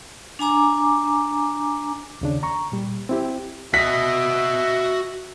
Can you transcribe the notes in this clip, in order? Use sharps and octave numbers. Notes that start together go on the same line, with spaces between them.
D4 G#5 A#5 D6
D#2 C#3 D4
A#5 C#6
A#2 G3
C4 E4 G4
F#4 D#5 E5 B6